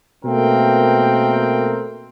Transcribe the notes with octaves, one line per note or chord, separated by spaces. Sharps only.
B2 A3 A#3 C4 A#4 G5